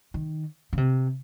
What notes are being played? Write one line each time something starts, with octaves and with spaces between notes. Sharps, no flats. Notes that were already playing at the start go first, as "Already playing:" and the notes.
D#3
C#3
C3